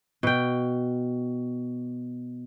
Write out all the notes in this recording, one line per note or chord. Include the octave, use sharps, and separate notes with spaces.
B2 G5